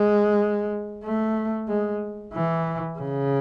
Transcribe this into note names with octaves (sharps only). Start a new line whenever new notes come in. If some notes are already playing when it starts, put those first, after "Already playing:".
Already playing: G#3
A3
G#3
E3
C#3